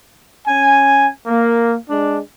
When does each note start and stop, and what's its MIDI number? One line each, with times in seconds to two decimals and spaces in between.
0.47 1.08 61
0.47 1.08 80
1.27 1.73 58
1.89 2.18 56
1.89 2.18 62